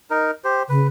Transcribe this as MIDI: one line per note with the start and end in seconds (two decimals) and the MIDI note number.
0.10 0.31 63
0.10 0.31 70
0.44 0.63 67
0.44 0.63 72
0.69 0.88 49
0.69 0.87 71